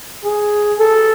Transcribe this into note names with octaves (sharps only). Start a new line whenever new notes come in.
G#4
A4